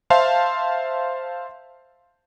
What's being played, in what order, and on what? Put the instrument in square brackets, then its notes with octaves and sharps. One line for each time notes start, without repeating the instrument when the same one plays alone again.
[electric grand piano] C5 E5 F5 A5 C6